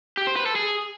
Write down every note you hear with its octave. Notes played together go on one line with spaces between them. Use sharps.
G4
C5
B4
A4
G#4